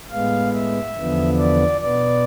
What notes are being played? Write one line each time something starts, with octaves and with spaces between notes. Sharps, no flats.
A2 G#3 B3 F5
E5
E2 D3 F3 B3
D5
B2 B3 D5